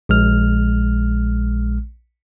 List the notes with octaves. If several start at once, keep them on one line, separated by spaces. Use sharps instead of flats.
A#1 G#3 F6